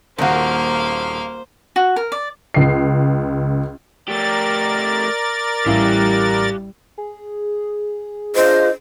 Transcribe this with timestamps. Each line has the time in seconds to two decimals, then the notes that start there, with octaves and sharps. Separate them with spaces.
0.18 D#1 D#3 A#3 D#4 F#4 C5 F5
1.76 F#4
1.96 A#4
2.12 D5
2.54 C#2 C7
4.08 A3 G4 A#4 D5 A6
5.66 A1 G3 E4 G4 F5
6.98 G#4
8.35 D4 F4 C5 D#5